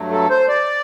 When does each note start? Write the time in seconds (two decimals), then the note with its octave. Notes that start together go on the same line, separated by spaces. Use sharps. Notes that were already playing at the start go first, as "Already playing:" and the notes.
Already playing: G2 F#3 A3
0.12 A4
0.30 C5
0.48 D5